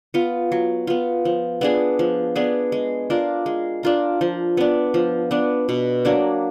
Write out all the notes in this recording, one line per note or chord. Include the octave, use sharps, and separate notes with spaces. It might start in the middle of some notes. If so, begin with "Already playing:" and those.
B3 F4
F#3
B3 F4
F3
B3 D4 G#4
F3
B3 D4 G#4
G#3
D4 F4 A#4
G#3
D4 F4 A#4
F3
B3 D4
F3
B3 D4
B2
F#3 A#3 D4